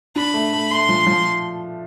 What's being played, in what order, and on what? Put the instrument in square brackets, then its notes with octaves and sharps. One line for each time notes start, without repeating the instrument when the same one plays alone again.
[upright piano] D4 [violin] B5
[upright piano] A3
A3
[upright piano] A3 [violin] C6
[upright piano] F3
F3